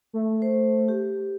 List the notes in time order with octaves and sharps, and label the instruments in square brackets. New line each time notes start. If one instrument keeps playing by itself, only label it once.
[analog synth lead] A3
[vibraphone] C5
G4